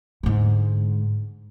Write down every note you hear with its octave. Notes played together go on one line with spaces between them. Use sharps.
G#2 D3